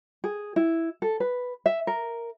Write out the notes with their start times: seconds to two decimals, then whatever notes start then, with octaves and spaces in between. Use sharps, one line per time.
0.24 G#4
0.56 E4
1.02 A4
1.20 B4
1.66 E5
1.87 A#4